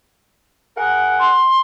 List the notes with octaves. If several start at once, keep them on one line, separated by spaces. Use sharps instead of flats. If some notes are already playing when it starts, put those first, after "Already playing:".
G#4 A#4 F#5
C6